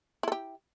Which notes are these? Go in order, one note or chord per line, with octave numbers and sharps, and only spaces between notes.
E4 G4 A4